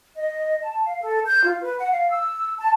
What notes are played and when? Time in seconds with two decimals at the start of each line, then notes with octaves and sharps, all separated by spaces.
0.16 D#5
0.62 A5
0.85 F5
1.01 A4
1.26 G6
1.45 F4
1.61 B4
1.78 F#5
1.91 F5
2.11 E6
2.58 A5